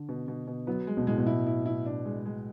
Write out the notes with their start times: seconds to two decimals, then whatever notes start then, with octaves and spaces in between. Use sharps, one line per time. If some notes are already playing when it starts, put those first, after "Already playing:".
Already playing: D3
0.09 B2
0.28 B2
0.47 B2
0.67 F#3 B3
0.87 G#3
0.97 B2
1.07 A2 G#3
1.18 B2
1.27 E4
1.47 E4
1.66 E4
1.86 D4
2.05 G#3
2.25 G#3